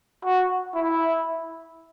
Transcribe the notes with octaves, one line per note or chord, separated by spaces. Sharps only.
F#4
E4